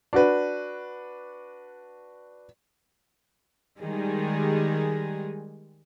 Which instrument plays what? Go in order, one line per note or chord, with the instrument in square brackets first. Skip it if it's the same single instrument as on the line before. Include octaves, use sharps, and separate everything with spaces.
[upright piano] D4 F#4 B4
[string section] D#3 G3 G#3 G#4